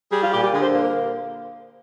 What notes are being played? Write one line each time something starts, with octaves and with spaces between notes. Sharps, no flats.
G3 G#4
F4
A#2 G4
G4
D3 G#4
C5
A#3 C5
A#4